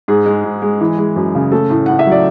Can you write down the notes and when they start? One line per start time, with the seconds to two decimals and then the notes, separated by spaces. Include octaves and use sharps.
0.08 G#2 G#4
0.26 G#3
0.44 G#2
0.62 G#3
0.81 E3
0.98 G#3
1.16 F#2
1.35 C#3
1.52 A3 A4
1.70 A2
1.86 A2 F#5
1.99 E5
2.07 F#3 D5